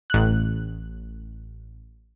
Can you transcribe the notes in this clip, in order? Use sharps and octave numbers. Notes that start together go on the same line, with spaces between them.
A1 F#6